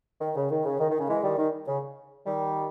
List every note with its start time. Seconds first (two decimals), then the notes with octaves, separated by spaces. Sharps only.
0.21 D#3
0.36 C#3
0.51 D#3
0.65 C#3
0.80 D#3
0.90 D#3
0.99 C#3
1.09 E3 G#3
1.23 D#3 G3
1.38 D#3
1.68 C#3
2.26 D#3 G3